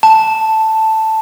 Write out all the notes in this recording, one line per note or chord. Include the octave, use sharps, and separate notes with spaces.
A5